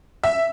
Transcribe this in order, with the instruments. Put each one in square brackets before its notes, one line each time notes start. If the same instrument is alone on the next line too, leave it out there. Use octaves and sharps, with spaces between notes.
[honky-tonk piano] E5